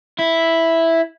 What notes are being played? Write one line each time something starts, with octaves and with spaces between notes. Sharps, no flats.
E4